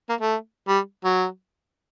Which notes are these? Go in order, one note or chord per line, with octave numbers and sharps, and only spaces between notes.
A#3
A3
G3
F#3